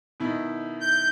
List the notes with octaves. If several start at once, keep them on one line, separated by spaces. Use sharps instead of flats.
B2 D#3 E4
G6